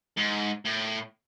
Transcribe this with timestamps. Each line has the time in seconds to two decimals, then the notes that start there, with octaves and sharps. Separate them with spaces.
0.17 G#2
0.65 A2